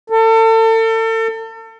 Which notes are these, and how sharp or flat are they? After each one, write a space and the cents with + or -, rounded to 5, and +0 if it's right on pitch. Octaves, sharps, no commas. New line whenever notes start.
A4 +35